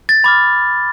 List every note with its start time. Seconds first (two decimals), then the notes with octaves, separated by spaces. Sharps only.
0.09 A6
0.24 B5 D6 F6 A6